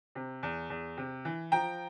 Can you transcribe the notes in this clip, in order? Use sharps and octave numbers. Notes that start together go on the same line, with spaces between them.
C3
E2
E2
C3
E3
F3 G5 A#5